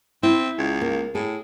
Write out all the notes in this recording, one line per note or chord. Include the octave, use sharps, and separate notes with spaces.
C4 E4
C#2
A#3
A2 G#4